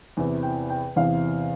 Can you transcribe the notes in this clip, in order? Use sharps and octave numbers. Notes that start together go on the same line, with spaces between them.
E2 C3 E3
G5
G5
E2 C3 E3 F5